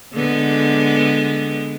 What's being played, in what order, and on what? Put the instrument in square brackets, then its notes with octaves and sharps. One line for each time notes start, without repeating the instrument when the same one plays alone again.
[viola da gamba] D3 G#3 B3